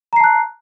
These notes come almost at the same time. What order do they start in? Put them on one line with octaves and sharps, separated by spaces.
A#5 C7 A5 F#6